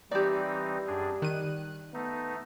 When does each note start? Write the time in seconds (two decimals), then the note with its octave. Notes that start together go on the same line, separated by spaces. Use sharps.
0.11 E3 G3 C4 D#4 G4 D5
0.87 F#2 D4 G#4
1.22 D#3 F#6 D#7
1.94 A3 B3 D#4